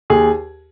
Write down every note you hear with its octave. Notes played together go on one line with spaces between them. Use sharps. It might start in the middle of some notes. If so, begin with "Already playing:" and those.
D#2 G#4